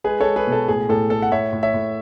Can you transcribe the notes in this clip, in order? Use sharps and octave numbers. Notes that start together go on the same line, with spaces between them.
G#3 G#4 B4
A4 C#5
G#3
G#4 B4
B2
A4
A2 G#4
A2 A4
A3 A4
F#5
A2 C#5 E5
A2
C#5 E5
A2